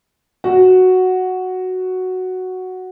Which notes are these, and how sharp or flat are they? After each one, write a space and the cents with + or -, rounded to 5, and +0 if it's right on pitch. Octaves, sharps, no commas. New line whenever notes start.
F#4 +0